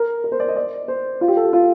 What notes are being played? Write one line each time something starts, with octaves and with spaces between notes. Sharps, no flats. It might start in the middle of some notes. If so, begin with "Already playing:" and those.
Already playing: A#4
A#4
C5
D5
D#5
D5
C5
F4
G4
A4
G4
F4